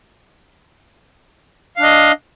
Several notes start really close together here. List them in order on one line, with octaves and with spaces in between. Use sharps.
F5 D4 D#5